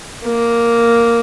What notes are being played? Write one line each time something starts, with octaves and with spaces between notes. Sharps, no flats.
A#3